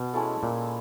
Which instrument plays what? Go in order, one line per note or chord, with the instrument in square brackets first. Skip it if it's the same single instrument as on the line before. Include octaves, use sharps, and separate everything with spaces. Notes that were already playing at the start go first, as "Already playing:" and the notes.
Already playing: [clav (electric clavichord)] B2
[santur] G#3 C#4 E4 A4
[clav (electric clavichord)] A#2